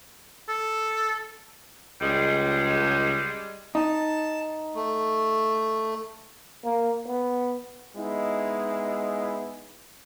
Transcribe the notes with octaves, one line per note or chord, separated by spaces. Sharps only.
A4
C#2 G3 G#3
D#4 A5
A3
A#3
B3
G#3 B3 D#4 E4